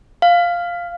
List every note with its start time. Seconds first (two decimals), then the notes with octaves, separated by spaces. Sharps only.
0.22 F5